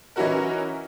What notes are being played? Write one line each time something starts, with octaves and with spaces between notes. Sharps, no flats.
E3 C#4 D#4 E4 F#4 A#4